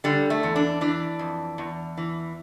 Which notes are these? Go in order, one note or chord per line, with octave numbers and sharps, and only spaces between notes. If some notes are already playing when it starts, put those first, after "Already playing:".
D3 G3
A3
E2
D4
E3 D4
F2
E2
E3